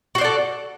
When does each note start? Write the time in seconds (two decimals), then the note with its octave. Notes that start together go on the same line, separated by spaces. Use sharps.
0.15 F#4
0.18 C5
0.21 D5
0.24 A4